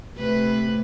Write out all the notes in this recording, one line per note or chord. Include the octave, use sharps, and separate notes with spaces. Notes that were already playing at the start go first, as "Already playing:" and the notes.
C3 A3 B4